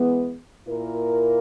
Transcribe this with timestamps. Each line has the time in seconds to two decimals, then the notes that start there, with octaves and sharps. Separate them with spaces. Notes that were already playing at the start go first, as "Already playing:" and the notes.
Already playing: E3 G#3 B3
0.68 A#2 A#3 E4 A#4